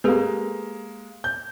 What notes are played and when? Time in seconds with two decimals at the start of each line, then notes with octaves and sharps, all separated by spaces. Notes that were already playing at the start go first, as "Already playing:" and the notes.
0.04 G#3 A#3 G4 A4 B4
1.24 G6